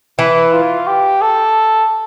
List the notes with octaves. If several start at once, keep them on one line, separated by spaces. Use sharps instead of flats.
E3 E4
F4
G4
A4